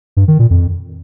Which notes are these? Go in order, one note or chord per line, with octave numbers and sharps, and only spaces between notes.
G2
D#3
A#2
F2